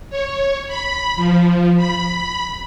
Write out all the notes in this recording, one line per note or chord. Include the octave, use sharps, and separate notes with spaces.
C#5
B5
F3
B5